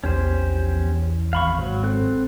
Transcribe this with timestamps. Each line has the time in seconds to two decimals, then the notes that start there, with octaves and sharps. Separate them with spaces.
0.04 A#1 E2 C#4 G4 C5
1.33 G#1 F5 B5 C#6
1.58 G#2 F#3
1.83 C4 A4 F#6